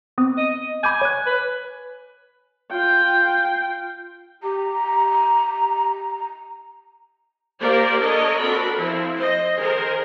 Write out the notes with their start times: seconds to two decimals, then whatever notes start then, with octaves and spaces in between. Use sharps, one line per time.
0.18 B3 C4 D#6
0.38 D#5
0.84 G#5 B5 D6 G6
1.01 C#5 F#6
1.27 B4
2.72 F4 G5
4.43 G4 A#5
7.60 A#3 F4 G4 A#4 C5 D5
7.99 D4 A4 A#4 C#5 D#5
8.39 C4 D4 F#4 A4 A#4 B5
8.77 F3 C4 E4
9.15 C5 D#5
9.58 D#3 G#4 A#4 C5